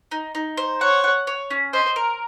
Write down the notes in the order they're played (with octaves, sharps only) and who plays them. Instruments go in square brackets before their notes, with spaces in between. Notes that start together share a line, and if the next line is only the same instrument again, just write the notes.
[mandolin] D#4
D#4
C5
[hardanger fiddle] C#5 [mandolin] F#5
[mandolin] F#5
C#5
C#4
[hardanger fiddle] C5 [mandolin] D#5
[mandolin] A#4